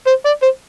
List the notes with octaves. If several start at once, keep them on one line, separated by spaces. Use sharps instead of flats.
C5
D5
C5